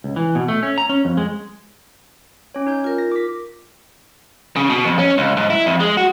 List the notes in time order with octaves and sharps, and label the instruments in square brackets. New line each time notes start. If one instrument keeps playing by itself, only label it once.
[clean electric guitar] C#2
E3
B2
A3
C#4
A#5
C#4
F2
G#3
[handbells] C#4 C#5
D#4 G6
[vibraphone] F4 A#4
[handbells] A#6
D6 B6
[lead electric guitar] C#3
B2
F2
C#4
C#2
G#2
E4
F2
G#3
F#4